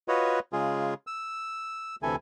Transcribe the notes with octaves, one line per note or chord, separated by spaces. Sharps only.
F4 F#4 B4 C#5 D#5
C#3 G#3 F4 G#4
E6
D2 C3 E3 E4 A4 G#5